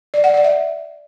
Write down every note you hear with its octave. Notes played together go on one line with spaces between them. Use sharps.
D5
F#5
D5
E5